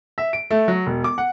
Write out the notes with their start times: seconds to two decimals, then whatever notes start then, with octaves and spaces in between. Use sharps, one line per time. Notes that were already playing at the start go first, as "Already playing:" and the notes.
0.18 E5
0.33 D7
0.51 A3
0.68 F#3
0.86 E1
1.04 D6
1.18 F#5